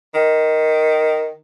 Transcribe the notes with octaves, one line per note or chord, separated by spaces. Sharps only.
D#3